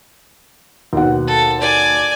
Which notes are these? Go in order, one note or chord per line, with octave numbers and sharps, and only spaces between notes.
D#2 B2 F#5
A4
D5 G#5